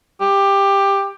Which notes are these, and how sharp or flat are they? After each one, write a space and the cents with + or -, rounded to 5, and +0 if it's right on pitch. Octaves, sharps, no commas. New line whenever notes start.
G4 +15